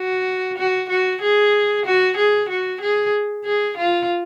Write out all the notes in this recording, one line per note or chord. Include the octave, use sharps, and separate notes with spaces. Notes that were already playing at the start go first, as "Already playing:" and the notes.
Already playing: F#4
F#4
F#4
G#4
F#4
G#4
F#4
G#4
G#4
F4